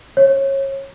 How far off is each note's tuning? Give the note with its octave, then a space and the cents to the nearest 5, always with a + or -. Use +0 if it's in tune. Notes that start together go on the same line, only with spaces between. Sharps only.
C#5 -25